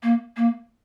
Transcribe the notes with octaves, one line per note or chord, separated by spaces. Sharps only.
A#3
A#3